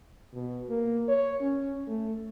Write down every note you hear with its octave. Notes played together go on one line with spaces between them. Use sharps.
B2
A#3
C#5
C#4
A3